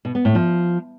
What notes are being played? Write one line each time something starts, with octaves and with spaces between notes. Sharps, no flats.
B2
B3
A2
F3